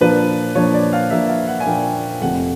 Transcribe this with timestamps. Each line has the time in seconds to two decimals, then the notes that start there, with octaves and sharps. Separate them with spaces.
0.01 A#2 F3 A#3 D4 B4
0.55 A#2 F3 A#3 D4 C#5
0.74 D5
0.93 F5
1.10 A#2 F3 A#3 D4 E5
1.29 F5
1.48 F#5
1.60 G#5
1.66 A#2 F3 A#3 D4 G5
2.22 F1 F2 C3 F3 A3 F#5